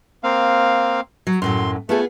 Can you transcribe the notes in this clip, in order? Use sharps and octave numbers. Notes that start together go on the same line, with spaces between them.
A#3 C4 F5
F#3
F#2 A2 F#3 C6
A3 B3 F4 G#4